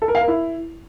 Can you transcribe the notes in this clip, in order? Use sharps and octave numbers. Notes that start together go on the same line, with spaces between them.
A4
A#4
F5
A#4
E4